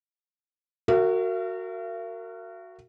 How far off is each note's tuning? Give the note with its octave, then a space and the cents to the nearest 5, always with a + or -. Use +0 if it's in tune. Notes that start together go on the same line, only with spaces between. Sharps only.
F#4 +0 A#4 -30 E5 +45